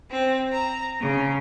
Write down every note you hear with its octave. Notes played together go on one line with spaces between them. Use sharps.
C4
A#5
C#3